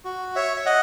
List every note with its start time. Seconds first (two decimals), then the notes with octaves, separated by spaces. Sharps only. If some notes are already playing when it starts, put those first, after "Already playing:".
0.05 F#4
0.35 C#5 E5
0.57 E5
0.66 D#5 F#5